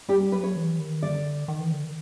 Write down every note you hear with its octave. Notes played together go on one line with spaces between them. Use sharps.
G3 G4
F#3 B4
C#5
E3
D#3
D3 D5
D#3
E3
D3
D#3